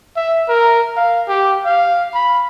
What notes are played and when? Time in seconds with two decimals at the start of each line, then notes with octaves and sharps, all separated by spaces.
0.16 E5
0.48 A#4
0.96 F5
1.28 G4
1.65 F5
2.14 B5